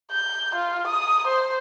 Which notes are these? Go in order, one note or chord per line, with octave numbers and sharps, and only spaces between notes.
G6
F4
D#6
C5